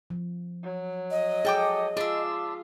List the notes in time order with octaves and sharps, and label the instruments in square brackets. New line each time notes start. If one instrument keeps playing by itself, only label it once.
[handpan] F3
[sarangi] F#3
[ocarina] D#5
[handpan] G#4 [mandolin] A4 G5 D6
[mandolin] D4 E5 [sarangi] F4 [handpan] G#4